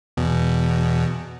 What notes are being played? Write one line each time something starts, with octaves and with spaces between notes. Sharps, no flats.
E2 B2